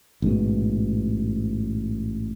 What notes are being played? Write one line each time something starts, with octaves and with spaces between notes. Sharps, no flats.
A1 G#2 B2